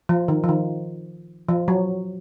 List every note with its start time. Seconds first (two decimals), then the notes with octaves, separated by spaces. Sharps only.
0.09 F3
0.28 D#3
0.44 F3
0.49 D#3
1.49 F3
1.68 F#3